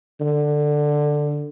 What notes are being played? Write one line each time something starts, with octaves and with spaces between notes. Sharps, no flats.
D3